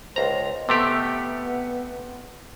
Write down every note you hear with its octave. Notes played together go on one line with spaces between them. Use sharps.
C#2 C5 A#5
C3 A3 B3 G4